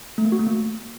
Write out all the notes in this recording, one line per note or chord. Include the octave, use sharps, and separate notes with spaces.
A3
A#3
F#4
A3
A#3